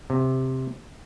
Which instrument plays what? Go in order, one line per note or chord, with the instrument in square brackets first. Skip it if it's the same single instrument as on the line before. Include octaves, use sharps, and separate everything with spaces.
[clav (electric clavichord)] C3